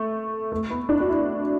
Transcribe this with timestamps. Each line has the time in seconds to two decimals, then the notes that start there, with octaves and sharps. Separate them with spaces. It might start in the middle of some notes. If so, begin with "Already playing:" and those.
Already playing: A3
0.52 A3
0.70 B3
0.89 D4
1.00 F#4
1.08 E4